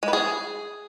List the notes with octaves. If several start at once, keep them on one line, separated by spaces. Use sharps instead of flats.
G#3
B4
G#4